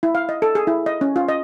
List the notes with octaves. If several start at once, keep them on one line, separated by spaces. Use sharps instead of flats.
E4
F5
D#5
A4
G#4
E4
D#5
C#4
F4
D#5